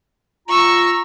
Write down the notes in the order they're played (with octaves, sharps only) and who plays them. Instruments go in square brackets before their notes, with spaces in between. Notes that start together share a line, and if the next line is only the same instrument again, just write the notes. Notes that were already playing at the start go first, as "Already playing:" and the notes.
[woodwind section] F4 A#5 [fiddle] C#6 E6